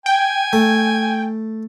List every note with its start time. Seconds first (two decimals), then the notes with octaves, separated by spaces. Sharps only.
0.06 G5 G#5
0.53 A3